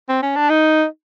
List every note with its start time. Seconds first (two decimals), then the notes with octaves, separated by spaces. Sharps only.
0.09 C4
0.22 C#4
0.36 D4
0.50 D#4